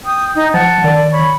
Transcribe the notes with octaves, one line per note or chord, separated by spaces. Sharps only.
G5 D#6
D#4
F3 F#5 A5
D#3 D5
C#5 B5